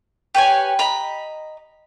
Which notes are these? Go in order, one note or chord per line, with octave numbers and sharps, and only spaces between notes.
G4 B4 C#5 G#5
D#5 A#5 B5